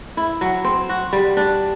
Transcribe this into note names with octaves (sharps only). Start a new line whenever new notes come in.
E4
F#3
C4
F#4
G3
D4